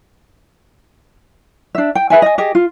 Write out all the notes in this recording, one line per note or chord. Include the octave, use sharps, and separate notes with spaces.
D4 E5
G5
G#4 B4 E5 G#5
D#5 G#5
G4 G#4 D#5
F4